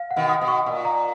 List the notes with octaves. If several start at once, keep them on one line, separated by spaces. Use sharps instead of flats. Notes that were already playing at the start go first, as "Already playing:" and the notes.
Already playing: F5
F#5
B2 D#3
D#6
B2
C#6
A#2
A#5